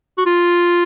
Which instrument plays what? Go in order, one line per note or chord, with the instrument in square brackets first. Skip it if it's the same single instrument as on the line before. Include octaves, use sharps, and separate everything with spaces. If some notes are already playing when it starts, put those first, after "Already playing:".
[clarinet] F#4
F4